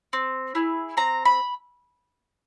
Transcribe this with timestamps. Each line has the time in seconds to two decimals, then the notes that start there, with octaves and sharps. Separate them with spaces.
0.13 C4
0.55 E4 G#4
0.97 C4 A#5
1.25 B5